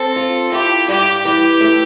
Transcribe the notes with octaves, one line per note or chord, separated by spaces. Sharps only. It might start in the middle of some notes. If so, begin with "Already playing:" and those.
Already playing: C4 A4
F4
E4 G4
G2 G4
E3 G4
A3